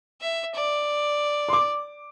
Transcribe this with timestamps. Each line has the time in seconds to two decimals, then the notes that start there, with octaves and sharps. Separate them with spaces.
0.21 E5
0.54 D5
1.49 C6
1.53 D6